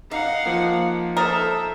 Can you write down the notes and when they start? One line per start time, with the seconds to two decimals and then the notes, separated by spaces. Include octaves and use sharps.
0.11 D#4 F5 F#5
0.46 F3 A#3
1.17 A4 A#4 C5 E5 D#6 A6